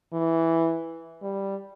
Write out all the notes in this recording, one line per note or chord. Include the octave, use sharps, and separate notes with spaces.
E3
G3